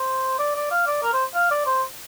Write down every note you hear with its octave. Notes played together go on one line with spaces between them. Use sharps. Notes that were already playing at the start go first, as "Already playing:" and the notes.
Already playing: C5
D5
D5
F5
D5
A#4
C5
F5
D5
C5